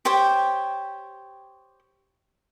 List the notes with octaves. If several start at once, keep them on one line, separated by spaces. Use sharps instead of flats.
G4 C5 C#5 G5